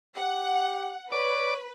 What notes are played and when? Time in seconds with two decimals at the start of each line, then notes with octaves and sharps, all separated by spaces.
0.17 G4 F#5
1.12 B4 C#5 D5 D6